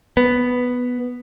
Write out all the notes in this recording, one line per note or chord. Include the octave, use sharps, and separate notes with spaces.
B3